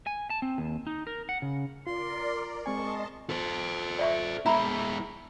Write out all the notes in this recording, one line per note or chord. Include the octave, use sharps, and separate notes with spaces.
G#5
A5
C4
D#2
D#4
A#4
F#5
C#3
F4 A#4 D5 C6
G#3 C4 D#5 G#5 A5 C6 C#6
A4 C5
D5 E5 C#6
G#3 E4 E5 A#5 B5